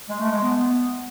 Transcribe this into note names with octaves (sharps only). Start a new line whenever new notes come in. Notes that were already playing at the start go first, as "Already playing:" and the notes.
G#3
A3
G#3
B3